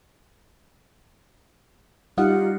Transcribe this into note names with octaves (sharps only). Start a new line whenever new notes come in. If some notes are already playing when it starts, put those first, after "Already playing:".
G3 D#4 F4 G4 F#5